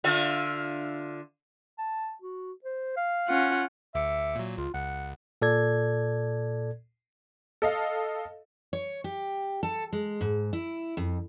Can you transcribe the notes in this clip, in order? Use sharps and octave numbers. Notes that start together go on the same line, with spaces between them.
D3 F4 E5
A5
F#4
C5
F5
C#4 F4 F#5
D2 E5 D6 C#7
A#2 F#3
C#2 F4
C#2 F#5
A#2 A4 D5 G#6
A4 D#5 F5
C#5
G4
A4
G#3
G#2
E4
F2